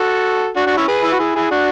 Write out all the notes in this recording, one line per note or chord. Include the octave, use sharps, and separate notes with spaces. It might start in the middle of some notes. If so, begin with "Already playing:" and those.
Already playing: F#4 A4
D4 F#4
D4 F#4
C#4 E4
G#4 B4
E4
F#4
E4 G#4
E4 G#4
D4 F#4